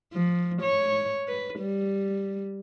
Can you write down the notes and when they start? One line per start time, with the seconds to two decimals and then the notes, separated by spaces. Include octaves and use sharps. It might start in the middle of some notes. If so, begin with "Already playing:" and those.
0.13 F3
0.62 C#5
1.28 B4
1.59 G3